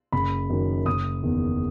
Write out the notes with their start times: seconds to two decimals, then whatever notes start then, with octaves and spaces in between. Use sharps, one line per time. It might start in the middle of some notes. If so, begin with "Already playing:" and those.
0.12 F#1 B5
0.50 F#2 D#3
0.86 F#1 D#6
1.23 E2 D#3